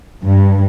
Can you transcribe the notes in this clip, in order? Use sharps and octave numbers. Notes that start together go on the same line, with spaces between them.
G2